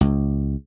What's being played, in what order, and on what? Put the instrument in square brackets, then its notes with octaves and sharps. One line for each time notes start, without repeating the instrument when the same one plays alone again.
[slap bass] C#2